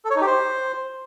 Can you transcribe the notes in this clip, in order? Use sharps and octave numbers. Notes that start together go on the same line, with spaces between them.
A4
C#5
D#4
G4
C5